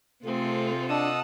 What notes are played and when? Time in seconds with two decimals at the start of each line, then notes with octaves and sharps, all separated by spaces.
0.25 C3 A3 C4 F4 G#4 A4
0.89 D4 D#5 F#5 A5 D#6 E6